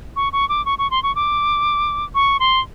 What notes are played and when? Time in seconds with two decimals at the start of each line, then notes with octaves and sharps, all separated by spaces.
0.16 C#6
0.33 C#6
0.49 D6
0.65 C#6
0.78 C#6
0.91 C6
1.03 C#6
1.15 D6
2.15 C#6
2.40 C6